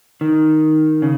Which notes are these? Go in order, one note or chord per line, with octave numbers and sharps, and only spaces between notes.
D#3
C#3